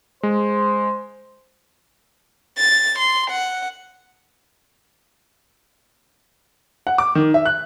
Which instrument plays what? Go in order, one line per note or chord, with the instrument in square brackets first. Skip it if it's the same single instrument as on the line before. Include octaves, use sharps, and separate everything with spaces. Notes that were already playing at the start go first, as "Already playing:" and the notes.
[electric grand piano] G#3 [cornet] C5
[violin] A6
C6
F#5
[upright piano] F#5
D6
D#3
E5
F#6